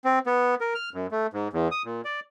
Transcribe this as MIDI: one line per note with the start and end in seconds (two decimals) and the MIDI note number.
0.05 0.19 60
0.26 0.55 59
0.61 0.74 70
0.75 0.90 89
0.94 1.07 42
1.11 1.27 57
1.33 1.48 44
1.53 1.68 40
1.71 1.82 87
1.85 2.01 46
2.05 2.20 74